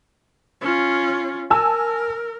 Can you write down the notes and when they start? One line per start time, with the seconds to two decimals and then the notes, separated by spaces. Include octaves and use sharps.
0.61 C#4 F4
1.50 A#4 G#5 A5 E6